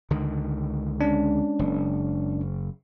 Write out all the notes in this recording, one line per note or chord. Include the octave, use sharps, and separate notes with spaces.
C#2 D3 D#3
G#3 C#4 D4
F#1